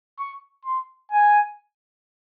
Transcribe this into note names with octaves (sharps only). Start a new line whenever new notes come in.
C#6
C6
G#5